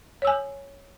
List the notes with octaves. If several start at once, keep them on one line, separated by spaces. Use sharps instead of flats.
C#5 G#5 E6